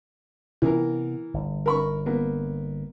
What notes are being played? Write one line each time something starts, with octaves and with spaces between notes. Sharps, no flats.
C3 E3 B3 A#4
G1
A#4 B5 C#6
A#3 B3